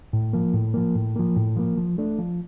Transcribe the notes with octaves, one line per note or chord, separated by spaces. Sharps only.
A2
F3 A#3
A2
F3 A#3
A2
F3 A#3
A2
F3 A#3
F3
A3 D4
F3